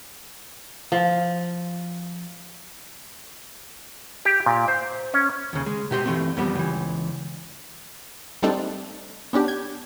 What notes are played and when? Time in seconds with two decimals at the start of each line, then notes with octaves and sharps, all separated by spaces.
0.92 F3
4.25 G4
4.46 A#2
4.68 C5
5.14 C#4
5.53 D#2 C#3
5.66 G#3
5.91 B2 G4 C6
6.06 E3 A3 C4
6.37 F2 G3 B3
6.55 C#2 E3
8.43 G3 A3 C4 D4 D#4 A4
9.33 B3 C#4 D4 G4
9.48 G6 G#6